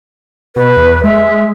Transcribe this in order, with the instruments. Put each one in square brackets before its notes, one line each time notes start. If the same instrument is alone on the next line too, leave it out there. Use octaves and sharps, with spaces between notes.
[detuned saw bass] B2 [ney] B4
[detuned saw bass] E2
[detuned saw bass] G#3 [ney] E5
[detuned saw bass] G#3